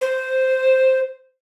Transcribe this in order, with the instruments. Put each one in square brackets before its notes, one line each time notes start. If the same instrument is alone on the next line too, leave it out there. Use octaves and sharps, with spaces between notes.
[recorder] C5